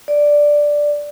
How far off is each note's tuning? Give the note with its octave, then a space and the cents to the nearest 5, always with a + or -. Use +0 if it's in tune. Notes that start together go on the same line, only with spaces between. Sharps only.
D5 +0